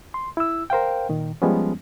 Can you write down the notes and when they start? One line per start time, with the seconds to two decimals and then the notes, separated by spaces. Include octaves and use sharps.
0.14 C6
0.37 E4 E6
0.70 A#4 C5 F5 G5
1.09 A#2 D#3
1.42 F3 G3 G#3 B3 C#4